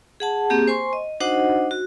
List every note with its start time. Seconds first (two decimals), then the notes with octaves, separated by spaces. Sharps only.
0.20 G#4 F#5 A5
0.50 A#3 C4 G4 G#4
0.68 C5 G#5 C6 C#6
0.93 D#5
1.20 D4 D#4 F#4 C5 D#5 F#5
1.71 F#4